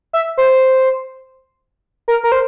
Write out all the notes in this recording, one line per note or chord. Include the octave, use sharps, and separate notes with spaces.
E5
C5
A#4
A#4
C5